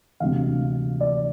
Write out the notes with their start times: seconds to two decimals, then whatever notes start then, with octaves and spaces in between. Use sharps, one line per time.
0.20 E1 D2 C3 F5
1.01 D5